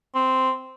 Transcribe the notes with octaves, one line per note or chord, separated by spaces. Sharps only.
C4